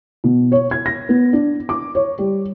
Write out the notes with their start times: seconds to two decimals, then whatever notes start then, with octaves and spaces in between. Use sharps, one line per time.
0.24 B2
0.52 C#5
0.71 G#6
0.86 A#6
1.09 B3
1.33 D4
1.69 D6
1.95 C#5
2.19 G3